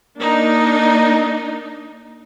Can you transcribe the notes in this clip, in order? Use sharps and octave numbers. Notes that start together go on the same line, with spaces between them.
A#3 D4 D#4